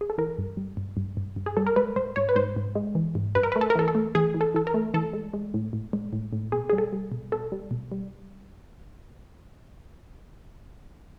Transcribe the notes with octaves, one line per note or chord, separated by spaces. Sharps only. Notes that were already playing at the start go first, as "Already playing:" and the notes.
G#4
A4
E3 A#4
G2
G3
G2
G2
G2
G2
G#4
G3 A4
A#4
G#3 B4
G#2 C5
G#2 C#5
B4
G#2 C5
G#2
G#3
E3
G#2
G2 B4
A#4
A3 B4
A4
A#4
E3 A4
A4
A3
E3 G#4
E3
A4
E3 A4
A#4
A3
E3 A4
G#3
G#3
A2
A2
G#3
A2
A2
B2 G#4
G3 G#4
A4
G3
B2
B2 A4
G3
B2
G3